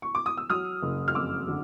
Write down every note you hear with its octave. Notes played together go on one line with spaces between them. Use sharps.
C#6
D6
D#6
E6
F#3 D#6 F6
F#1
F6
F2 D6 E6
D3